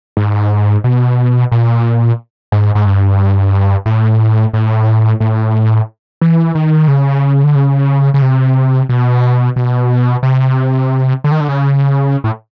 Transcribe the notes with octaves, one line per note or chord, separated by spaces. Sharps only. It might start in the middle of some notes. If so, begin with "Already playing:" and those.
G#2
B2
A#2
G#2
G#2
G2
A2
A2
A2
E3
D#3
C#3
D3
C#3
C#3
C3
B2
B2
C3
D3
D#3
D3
C#3
A2